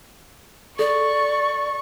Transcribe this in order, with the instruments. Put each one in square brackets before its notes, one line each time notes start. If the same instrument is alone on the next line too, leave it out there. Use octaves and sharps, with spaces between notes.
[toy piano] A4 [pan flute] D5 [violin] C#6